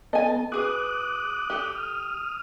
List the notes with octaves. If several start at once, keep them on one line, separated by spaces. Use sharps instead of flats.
B3 A4 D#5 G#5 A5
F#4 G#4 B4 D6 D#6 F#6
G4 A4
D#6 F6